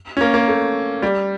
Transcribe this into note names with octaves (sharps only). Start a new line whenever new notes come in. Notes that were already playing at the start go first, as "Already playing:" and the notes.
C#4
A#3
A#3
A3
G3